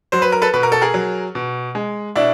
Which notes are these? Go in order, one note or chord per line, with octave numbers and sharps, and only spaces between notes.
F#3 C5
B4
A#4
A4 B4
B2 B4
A#4
A4
G#4 A#4
F#3
B2
G#3
B2 D4 E4